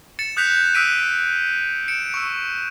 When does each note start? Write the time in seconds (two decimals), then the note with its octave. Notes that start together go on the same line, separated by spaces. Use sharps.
0.19 A6 C#7 E7
0.37 D#6 F#6 G6 B6 F7
0.74 D#6 E6 F#6 B6 D7 D#7
1.88 C#7 D7 E7
2.14 C#6 E6